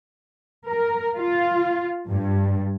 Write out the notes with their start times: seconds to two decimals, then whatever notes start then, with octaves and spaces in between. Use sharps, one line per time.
0.69 A#4
1.15 F4
2.09 G2